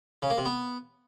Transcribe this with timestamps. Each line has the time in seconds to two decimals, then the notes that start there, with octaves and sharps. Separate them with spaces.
0.22 C#3
0.30 A#3
0.38 C3
0.45 B3